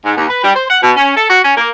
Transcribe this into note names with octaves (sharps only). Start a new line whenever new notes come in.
G#2
D#2
B4
G3
C5
F#5
B2
C#4
A4
F#4
C#4
A#3